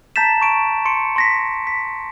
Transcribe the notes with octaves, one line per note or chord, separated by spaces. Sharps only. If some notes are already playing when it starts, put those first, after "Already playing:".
A5 A#5 G6 A6 B6 E7
A5 C#6 D7 E7
C6 C#7 D7
C6 A#6 B6
B6